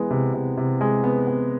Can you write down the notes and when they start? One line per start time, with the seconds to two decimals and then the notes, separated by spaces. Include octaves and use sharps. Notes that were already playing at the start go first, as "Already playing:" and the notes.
Already playing: E3 G#3 B3
0.10 C3
0.34 C3
0.57 C3
0.81 G#3
1.04 B3
1.27 B3